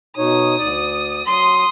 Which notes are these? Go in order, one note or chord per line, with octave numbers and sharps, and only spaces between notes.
B2 D#4 C#5 D#6
D2 D5
F#3 C6 D#6